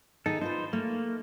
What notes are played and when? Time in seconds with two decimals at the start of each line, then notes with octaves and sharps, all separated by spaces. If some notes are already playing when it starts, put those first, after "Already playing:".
0.26 D#3 D#4 G#4 A4
0.41 D#4 F4 B4 C5
0.73 A3 A#3